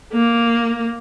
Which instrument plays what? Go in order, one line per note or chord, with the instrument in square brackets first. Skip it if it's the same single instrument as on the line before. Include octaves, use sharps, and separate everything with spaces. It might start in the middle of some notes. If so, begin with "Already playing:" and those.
[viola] A#3